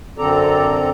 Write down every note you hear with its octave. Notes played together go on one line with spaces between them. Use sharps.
F#2 D3 C4 A4 D5 A#5